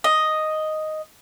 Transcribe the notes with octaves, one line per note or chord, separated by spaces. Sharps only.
D#5